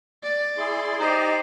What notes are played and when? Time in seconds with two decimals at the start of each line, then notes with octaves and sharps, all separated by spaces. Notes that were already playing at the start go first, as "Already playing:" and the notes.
0.23 D5
0.57 E4 G#4 C6
1.00 D#4 G4 C5 D5 D#5